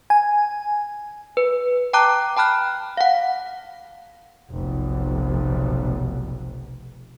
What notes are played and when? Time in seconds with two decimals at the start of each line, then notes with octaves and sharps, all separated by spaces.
0.10 G#5
1.37 B4
1.93 G5 A5 A#5 D6 F#6
2.37 G5 A5 B5 F6 F#6
2.97 F5 F#5
4.50 F1 B1